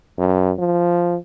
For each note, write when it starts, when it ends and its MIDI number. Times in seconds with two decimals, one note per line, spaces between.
0.18 0.53 42
0.59 1.16 53